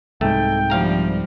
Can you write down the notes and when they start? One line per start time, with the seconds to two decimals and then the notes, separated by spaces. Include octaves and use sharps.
0.21 C2 G#2 A3 G5
0.70 D2 F3 G3 C4 F5 A#5